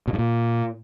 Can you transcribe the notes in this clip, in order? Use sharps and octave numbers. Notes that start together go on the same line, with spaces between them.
B2
G2
A#2